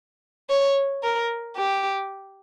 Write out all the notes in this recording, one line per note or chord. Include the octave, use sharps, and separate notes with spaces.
C#5
A#4
G4